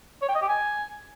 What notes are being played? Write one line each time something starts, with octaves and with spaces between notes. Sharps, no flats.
C#5
G5
D#5
G4
G#5